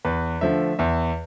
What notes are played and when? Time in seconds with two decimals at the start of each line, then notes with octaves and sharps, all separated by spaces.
0.05 E2 B4
0.41 D3 F3 A3 E5
0.79 E2 E5